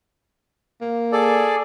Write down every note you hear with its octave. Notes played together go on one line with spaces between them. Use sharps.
A#3
G#4 A4 D5